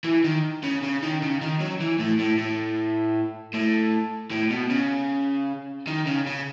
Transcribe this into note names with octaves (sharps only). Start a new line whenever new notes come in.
E3
D#3
C#3
C#3
D#3
C#3
D#3
F#3
E3
A2
A2
A2
A2
A2
B2
C#3
D#3
C#3
C#3